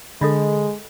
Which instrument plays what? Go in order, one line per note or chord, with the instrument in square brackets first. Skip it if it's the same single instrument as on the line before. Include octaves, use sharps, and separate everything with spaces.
[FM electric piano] D3 [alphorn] G#3 [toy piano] A4 D#5 B5